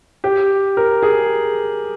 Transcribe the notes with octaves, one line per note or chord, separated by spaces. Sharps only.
G4
A#4
G#4